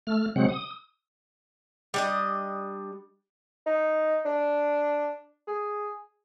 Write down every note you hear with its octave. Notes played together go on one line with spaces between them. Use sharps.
A3 F6
C3 F#3 G#3 C4 F#5
D#6
G3 D4 D#5
D#4
D4
G#4